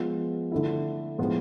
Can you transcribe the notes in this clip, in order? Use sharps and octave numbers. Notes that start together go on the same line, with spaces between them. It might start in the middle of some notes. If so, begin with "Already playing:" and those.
Already playing: F3 G#3 B3 F4
D3 A3 E4
A2 F3 G#3 B3 F4